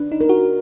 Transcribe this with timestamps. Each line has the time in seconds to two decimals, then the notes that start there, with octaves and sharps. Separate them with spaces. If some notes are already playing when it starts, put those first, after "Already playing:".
Already playing: D4 B4
0.12 D#4
0.21 A#4
0.29 F#4